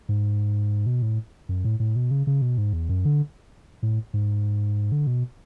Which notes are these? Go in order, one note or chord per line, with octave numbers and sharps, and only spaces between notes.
G#2
B2
A2
F#2
A2
A2
B2
C#3
C#3
B2
G#2
E2
F#2
D3
A2
G#2
D3
B2